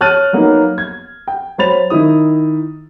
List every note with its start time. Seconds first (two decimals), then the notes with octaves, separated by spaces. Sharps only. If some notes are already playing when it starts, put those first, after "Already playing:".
0.01 C#5 A5 F6 F#6 A6 D#7
0.33 F#3 A#3 B3 D#4
0.78 G#6
1.28 G5
1.58 F#3 C5 B5 A6 F7
1.90 D#3 D#4 E4 D#6